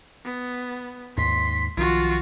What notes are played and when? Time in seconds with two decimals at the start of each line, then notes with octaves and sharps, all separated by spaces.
0.25 B3
1.17 D#2 G#2 C6 B6
1.77 B1 D#3 F3 F4 F#4